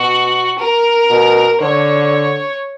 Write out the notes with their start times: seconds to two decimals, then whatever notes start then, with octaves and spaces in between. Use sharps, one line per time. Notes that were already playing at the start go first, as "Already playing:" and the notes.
Already playing: B2 F#4
0.58 A#4
1.10 B2
1.61 D3 C#5